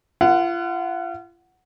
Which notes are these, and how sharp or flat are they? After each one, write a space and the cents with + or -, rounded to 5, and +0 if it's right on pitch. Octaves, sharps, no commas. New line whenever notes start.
F4 -35 F#5 +0